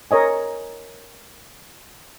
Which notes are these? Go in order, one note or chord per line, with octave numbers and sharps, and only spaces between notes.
A#4 C#5 D#5 G#5